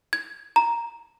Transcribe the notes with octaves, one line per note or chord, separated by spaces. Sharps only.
G#6
A#5